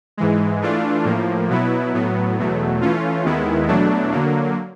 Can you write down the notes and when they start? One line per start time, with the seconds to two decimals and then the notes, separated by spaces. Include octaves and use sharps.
0.17 G#2 E3 G#3
0.62 E3 A3 D4 F4
1.05 A2 F3 A#3
1.49 B2 F#3 B3 E4
1.93 A2 F#3 B3
2.38 E2 B2 F#3 A3
2.81 E3 A3 C#4 F4
3.25 D#2 D#3 G#3 B3 E4
3.68 E2 B2 F#3 A3 D4
4.12 D3 F#3 A#3